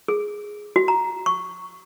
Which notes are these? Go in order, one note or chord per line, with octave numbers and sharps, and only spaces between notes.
G#4
F#4
A#5
C#6